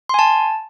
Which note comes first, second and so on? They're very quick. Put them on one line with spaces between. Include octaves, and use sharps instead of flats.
C6 G#5 A5